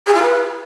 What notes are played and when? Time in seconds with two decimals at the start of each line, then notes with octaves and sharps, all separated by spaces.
0.06 G#4
0.14 F4
0.22 B4